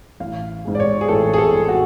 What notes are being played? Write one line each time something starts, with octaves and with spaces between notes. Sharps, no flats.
A1 F5
G#2 G#3
D5
C#5
G#4
A1 A4
G#4
A4
G#2 G#3
F#4